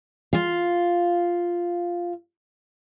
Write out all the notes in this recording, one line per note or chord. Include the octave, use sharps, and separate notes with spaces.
F4 F5